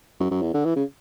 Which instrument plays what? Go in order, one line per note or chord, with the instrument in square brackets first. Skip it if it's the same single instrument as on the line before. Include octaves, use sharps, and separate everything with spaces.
[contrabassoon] F#2
F#2
E2
D3
E3
C#3